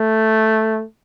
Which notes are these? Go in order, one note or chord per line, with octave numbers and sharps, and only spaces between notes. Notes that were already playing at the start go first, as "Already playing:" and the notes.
Already playing: A3